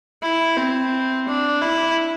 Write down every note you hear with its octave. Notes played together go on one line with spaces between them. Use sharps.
E4
C4
D4
E4